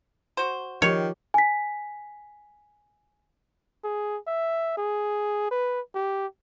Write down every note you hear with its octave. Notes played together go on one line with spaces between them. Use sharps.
F#4 C5
D#3 F3 G4 C#5
G#5 B6
G#4
E5
G#4
B4
G4